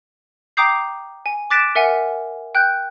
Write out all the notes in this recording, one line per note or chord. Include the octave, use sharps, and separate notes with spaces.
G5 A#5 D6 D#6 G6 C7
G#5
D6 F#6 A6 B6 D7 E7
A#4 E5 F#5 G#5
G5 F#6 G6